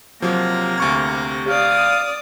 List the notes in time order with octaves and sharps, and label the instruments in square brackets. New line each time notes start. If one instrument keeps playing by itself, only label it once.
[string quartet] C3 A#6 [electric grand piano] F3 F#3 [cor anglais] A#3
[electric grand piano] D2 C#6 G#6
[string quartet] D5 D#6 [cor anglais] F5